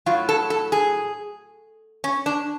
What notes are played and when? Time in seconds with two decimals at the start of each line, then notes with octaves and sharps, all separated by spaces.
0.06 A2 F#3 F4
0.29 A4
0.50 A4
0.72 G#4
2.04 C#4
2.26 D4